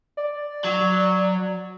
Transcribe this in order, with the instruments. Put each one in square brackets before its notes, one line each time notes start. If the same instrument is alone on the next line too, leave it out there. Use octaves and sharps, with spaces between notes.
[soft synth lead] D5
[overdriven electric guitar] F#3